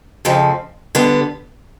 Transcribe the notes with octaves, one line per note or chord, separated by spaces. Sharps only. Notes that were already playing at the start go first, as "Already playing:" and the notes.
F2 C#3 F3 A3
D3 G3 B3